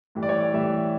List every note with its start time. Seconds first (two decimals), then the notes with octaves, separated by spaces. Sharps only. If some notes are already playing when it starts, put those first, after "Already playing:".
0.15 A2 E3 G3
0.23 D5
0.29 C#5
0.41 D5
0.53 A2 E3 G3 E5